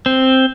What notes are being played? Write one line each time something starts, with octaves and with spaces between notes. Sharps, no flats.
C4